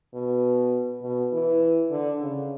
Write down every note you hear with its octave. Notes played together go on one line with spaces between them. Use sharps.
B2
B2
E3
D3
C#3